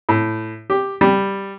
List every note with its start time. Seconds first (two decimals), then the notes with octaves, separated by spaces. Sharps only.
0.09 A2
0.70 G4
1.01 G3